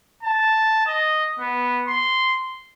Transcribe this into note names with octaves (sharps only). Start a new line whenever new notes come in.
A5
D#5
B3
C6